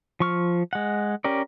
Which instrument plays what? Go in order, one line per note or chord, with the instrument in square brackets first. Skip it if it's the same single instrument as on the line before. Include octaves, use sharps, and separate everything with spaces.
[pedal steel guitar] F3 C#6 F6
G#3 F#5
C#4 G4 A#4 D5